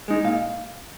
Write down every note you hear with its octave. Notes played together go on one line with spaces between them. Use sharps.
G#3 D#4
A#2 F5